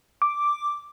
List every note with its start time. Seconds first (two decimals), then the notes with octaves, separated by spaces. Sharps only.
0.22 D6